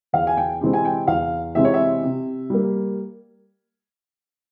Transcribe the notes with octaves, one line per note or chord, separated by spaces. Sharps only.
E2 F5
G#5
G5
C3 E3 G#3 C4
G#5
G5
E2 F5
C3 E3 G#3 C4 E5
C#5
E5
C3
G3 A#3